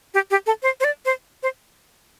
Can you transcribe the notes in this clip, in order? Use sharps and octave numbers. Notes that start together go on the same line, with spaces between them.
G4
G4
A4
C5
C5
D5
C5
C5